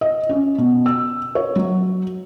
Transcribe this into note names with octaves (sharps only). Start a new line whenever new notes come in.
D#5
C#4
B2
E6
C#5
F#3